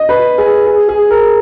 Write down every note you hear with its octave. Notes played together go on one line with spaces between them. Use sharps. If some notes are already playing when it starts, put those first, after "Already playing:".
Already playing: D#5
B4
G#4
G#4
G#4
A#4